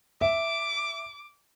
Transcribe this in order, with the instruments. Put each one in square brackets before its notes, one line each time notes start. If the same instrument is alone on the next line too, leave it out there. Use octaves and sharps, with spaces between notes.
[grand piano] E5 [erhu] D6